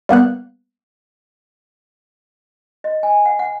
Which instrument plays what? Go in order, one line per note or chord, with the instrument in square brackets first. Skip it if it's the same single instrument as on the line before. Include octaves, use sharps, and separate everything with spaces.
[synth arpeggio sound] G3 A#3 B3 F#6
[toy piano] D#5
G#5
F#5
F#5